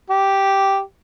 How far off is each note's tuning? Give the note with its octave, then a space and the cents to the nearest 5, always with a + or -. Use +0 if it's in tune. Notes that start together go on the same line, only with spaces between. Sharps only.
G4 -5